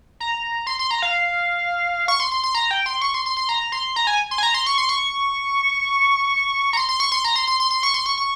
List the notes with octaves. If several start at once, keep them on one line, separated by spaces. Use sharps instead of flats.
A#5
C6
C6
A#5
F5
C#6
C6
C6
C6
A#5
G5
C6
C#6
C6
C6
C6
A#5
C6
A#5
G#5
C6
G#5
A#5
C6
C#6
C6
C#6
A#5
C6
C6
C#6
C6
A#5
C6
C6
C6
C6
C#6
C6
C#6
C#6